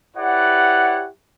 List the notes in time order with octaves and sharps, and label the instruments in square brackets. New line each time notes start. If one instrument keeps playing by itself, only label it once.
[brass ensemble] E4 G4 B4 C#5 D5 F#5